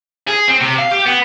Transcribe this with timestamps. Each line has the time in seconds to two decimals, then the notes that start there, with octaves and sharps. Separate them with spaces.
0.28 G#4
0.48 C4
0.61 C3
0.79 F5
0.92 G4
1.07 B3